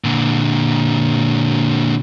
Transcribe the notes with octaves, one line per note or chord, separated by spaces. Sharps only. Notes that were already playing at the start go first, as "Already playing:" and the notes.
A#2 D3